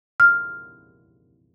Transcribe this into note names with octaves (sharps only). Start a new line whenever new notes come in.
F6